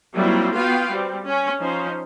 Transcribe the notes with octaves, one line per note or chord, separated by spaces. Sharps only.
F#3 G3 A#3 C4 E4 F4
B3 F4 F#4 B4 F5 G5
G3 C4
C#4
F3 C#4 D#4 C5